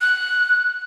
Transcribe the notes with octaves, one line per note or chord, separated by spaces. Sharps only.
F#6